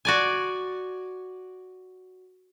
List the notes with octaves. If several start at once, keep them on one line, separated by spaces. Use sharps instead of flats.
F#4 D5 G#5